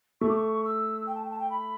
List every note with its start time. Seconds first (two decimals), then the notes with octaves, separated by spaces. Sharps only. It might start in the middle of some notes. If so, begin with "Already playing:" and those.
0.21 A3 C#6
0.28 D6
0.36 C#6
0.65 E6
1.07 G5
1.15 A5
1.23 G5
1.31 A5
1.39 G5
1.50 B5